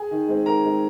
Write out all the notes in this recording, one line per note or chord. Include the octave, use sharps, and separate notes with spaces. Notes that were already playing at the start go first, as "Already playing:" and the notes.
Already playing: G#4 G#5
D#3
G#3 C4
D#3 A#4 A#5
G#3 C4